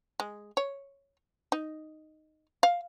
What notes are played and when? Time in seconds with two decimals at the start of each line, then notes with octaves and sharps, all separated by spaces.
0.20 G#3
0.57 C#5
1.52 D#4
2.63 F5